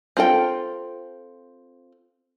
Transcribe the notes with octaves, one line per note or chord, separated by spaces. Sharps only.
C4 F4 A4 G5